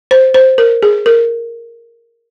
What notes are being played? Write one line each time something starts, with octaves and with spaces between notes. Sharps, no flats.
C5
C5
A#4
G#4
A#4